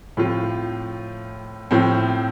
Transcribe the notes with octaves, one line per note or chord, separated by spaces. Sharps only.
A2 F3 C4 F4
A2 F3 C4